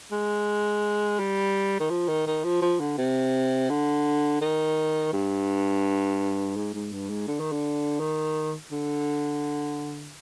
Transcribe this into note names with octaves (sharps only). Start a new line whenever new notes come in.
G#3
G3
D#3
F3
D#3
D#3
F3
F3
D3
C3
D3
D#3
G2
G#2
G#2
G2
G#2
D3
D#3
D3
D#3
D3